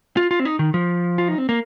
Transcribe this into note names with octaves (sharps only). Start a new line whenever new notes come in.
F4
F4
C4
D#4
D#3
F3
F4
D#4
C4
A#3